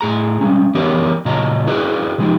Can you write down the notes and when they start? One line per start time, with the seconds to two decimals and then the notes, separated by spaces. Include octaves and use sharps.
0.01 A2 G#4 A#5
0.41 G3 G#3 C#4
0.75 E3 B3 G4 A#4 C#5 D5
1.25 A#2 C#3 F#3 D#5 A#5
1.67 E4 F#4 G#4 B4 C5 D5
2.18 C3 F3 G#3 D#4 G4